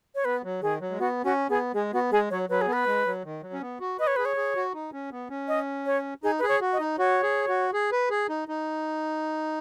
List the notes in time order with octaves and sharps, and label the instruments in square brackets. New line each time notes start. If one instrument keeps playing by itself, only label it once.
[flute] C#5
[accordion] B3 [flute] B4
[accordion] F#3
[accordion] D#3 [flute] G#4
[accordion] F#3
G#3
[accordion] B3 [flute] F#4
[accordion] C#4 [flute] F#4
[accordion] B3 [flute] G#4
[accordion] G#3 [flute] G#4
[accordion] B3 [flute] F#4
[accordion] G#3 [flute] G#4
[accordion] F#3 [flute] C#5
[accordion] F#3 [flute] B4
[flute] G#4
[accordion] B3
[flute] B4
[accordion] G#3
F#3
D#3
F#3
C#4
B3
F#4
[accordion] B4 [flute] D#5
[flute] C#5
[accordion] G#4 [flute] B4
[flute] C#5
[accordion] G#4
F#4
D#4
C#4
B3
C#4
[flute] D#5
C#5
[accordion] D#4 [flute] G#4
[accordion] G#4 [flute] B4
[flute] C#5
[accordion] F#4
[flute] D#5
[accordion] D#4
[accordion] F#4 [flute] C#5
[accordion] G#4
F#4
G#4
B4
G#4
D#4
D#4